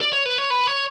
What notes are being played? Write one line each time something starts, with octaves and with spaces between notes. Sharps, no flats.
D5
C#5
B4
C#5
B4
C#5